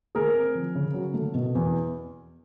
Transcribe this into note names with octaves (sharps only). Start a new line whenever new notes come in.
A3 G#4 A#4
C4
F3
C#3
F#3
A3
B2
E2